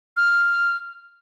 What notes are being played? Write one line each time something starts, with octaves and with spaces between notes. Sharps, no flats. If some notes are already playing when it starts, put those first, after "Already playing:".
F6